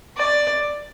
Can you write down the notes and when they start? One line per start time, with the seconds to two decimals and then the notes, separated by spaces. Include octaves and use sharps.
0.17 D5